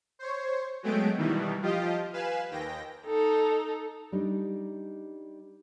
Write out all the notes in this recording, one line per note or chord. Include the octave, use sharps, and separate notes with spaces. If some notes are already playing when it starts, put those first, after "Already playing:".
C5 C#5
F#3 G#3 A3 B3 G5 D7
B2 D#3 E3 G3
F3 F4 G4 D#5
B4 F5 G#5 E7
D#2 G5 A#6
D#4 A4
G3 D4 D#4